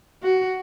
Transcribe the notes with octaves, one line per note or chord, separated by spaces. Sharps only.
F#4